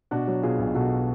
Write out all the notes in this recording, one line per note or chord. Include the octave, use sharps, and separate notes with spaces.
B2 D4 F#4
F#3
B2 F4 G#4
B1
B2 F#4 A4